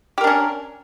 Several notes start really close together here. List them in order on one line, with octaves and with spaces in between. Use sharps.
G4 A#4 D4 C#4